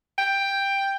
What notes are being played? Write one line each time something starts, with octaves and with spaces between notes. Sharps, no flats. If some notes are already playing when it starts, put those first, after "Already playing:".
G5